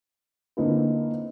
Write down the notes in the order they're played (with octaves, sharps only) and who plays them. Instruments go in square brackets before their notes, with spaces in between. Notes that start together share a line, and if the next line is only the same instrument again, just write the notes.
[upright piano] D3 A#3 C4 D#4 E4 B4